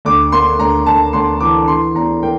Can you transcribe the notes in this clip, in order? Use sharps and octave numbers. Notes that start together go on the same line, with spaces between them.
D2 D6
A#3 C6
D2 A#5
D2 A5
D2 C6
E3 D6
E3 C6
E2 A#5
A#3 G5